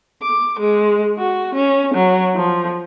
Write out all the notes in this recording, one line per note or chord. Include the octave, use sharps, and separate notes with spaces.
D6
G#3
F#4
C#4
F#3
F3